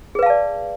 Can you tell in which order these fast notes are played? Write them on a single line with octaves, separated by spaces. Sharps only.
G#4 B4 F5 A5 D5